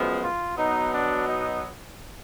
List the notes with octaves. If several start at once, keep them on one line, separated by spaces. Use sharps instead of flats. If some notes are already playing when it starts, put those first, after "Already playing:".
Already playing: F#2 F3 G#3 B3
F4
B2 F#3 B3 D#4
D4
D#4